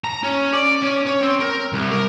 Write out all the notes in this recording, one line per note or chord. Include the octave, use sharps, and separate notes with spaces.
A#5
C#4
D5
C#4
C#5
C4
A#4
C2
A#4